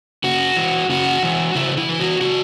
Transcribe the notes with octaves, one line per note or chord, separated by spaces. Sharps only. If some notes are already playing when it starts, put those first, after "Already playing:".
C#3 F#4
E3
C#3 F#4
E3
C#3 E4
E4
E3
F#4
C#3 F#4